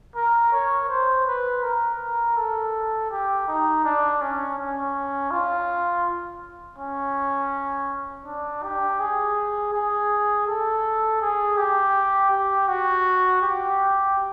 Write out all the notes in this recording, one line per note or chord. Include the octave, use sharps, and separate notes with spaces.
A#4
C#5
C5
B4
A#4
A4
G4
D#4
D4
C#4
C#4
F4
C#4
D4
G4
G#4
G#4
A4
G#4
G4
G4
F#4
G4